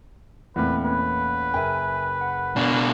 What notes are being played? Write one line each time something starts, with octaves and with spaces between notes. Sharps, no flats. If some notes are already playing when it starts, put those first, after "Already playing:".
E2 A#2 A3 A#3 C4 B4
A#3 C#4 B4
F#1 A#4 E5 G5 G#5
F#5
B2 D4 D5 G#5